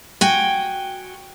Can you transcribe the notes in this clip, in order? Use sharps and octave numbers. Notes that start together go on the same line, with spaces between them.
F#4 G5 G#5